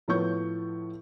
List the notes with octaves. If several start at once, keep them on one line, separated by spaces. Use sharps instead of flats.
A2 F3 B3 C#5 C#6 G6